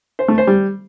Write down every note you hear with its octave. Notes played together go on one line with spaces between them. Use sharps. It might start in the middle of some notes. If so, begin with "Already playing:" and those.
C5
A3
C5
G3